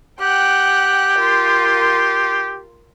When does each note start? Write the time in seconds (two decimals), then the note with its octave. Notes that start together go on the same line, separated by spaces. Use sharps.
0.21 G4 F#5 G5 F#6
1.18 F4 A#4 C6